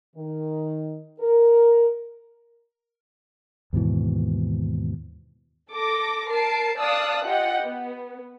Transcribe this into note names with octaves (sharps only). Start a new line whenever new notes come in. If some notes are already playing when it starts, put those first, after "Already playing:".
D#3
A#4
D#2 G#2 B2 E3
A4 D6 A#6
A#4 A5 C7 D7
D5 F5 A5 D#6 E6 F#6
F4 G4 D#5 F#5 G5
B3